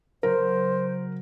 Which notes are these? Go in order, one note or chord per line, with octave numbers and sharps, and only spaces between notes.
C#3 F#3 A#4 C5